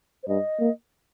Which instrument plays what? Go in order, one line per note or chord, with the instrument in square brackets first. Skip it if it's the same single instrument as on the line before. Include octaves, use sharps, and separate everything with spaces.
[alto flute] C5
[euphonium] G2 [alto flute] D#5
[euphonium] A#3